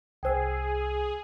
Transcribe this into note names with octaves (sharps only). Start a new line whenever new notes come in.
C2 G#4 C5 G5 E6